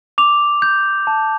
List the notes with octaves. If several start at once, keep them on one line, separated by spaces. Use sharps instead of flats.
D6 F7
G6
A5